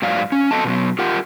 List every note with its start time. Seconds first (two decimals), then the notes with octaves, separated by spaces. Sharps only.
0.02 G#2 F#3 D5 F5
0.32 C#4
0.51 B3 A4 D#5 A5
0.65 B2 F#3 B3
0.99 F4 G4 A#4 F#5